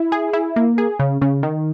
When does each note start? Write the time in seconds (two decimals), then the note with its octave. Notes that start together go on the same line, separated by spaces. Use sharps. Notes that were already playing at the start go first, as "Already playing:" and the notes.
Already playing: E4
0.12 G#4
0.33 E4
0.56 A#3
0.78 G#4
0.99 C#3
1.22 C#3
1.43 D#3